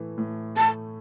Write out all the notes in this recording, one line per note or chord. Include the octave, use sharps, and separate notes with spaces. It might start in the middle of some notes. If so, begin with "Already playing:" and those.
Already playing: A2 E3 A3
A2
A3 A5